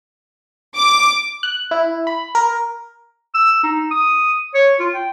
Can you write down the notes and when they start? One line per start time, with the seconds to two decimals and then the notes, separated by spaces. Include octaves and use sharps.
0.76 D6
1.43 F#6
1.71 E4
2.07 B5
2.35 A#4
3.34 E6
3.63 D#4
3.91 D#6
4.54 C#5
4.79 F4
4.94 G5